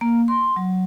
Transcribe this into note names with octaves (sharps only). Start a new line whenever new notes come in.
A#3
C6
F#3